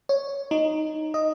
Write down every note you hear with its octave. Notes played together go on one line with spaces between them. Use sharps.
C#5
D#4
D#5